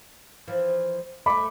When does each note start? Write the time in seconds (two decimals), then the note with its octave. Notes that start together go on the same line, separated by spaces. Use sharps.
0.48 E3 F3
1.26 A3 A4 B5 D6